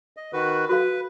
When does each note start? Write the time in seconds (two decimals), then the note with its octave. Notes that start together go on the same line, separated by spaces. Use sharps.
0.17 D#5
0.33 D#3 F#4 B4
0.69 F#4 A4 B4 F5